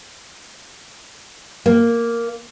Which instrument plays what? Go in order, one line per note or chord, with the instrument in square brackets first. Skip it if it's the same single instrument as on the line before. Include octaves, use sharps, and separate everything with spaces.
[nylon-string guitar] A#3